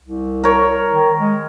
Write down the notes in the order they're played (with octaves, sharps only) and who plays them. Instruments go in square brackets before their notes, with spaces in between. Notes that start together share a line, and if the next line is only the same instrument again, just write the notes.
[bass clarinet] C2
[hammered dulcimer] A#4 C#5
[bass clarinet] D#3
G#3